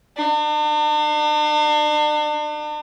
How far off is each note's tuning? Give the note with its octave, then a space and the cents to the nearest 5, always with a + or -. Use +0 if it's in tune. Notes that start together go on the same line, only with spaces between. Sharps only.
D4 +40